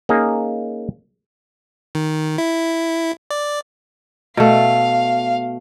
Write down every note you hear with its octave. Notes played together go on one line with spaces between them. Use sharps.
A#3 C#4 D#4 G#4
D#3
E4
D5
B2 A3 F5